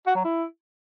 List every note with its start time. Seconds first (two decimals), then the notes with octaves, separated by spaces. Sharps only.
0.07 F#4
0.16 F#3
0.25 E4